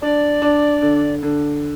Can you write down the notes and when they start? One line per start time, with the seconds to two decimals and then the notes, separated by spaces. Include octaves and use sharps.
0.02 D4 D5
0.42 D4
0.82 D3
1.23 D3